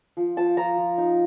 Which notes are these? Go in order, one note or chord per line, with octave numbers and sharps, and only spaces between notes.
F3
F3 A5
F3 A#5
F3
D#4